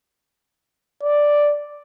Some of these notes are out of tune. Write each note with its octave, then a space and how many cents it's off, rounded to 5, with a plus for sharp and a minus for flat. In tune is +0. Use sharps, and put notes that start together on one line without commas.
D5 +0